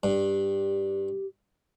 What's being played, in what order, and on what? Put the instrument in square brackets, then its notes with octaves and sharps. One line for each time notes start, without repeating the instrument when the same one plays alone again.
[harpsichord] G2 [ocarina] G4